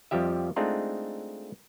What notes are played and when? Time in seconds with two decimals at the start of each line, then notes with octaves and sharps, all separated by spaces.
0.11 F2 F3 G3 G4 E5
0.56 G#3 A3 C4 D4 D#4 F4